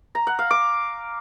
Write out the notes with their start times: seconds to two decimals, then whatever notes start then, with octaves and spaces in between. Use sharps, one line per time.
0.15 A#5
0.27 F#5
0.39 F5
0.51 D6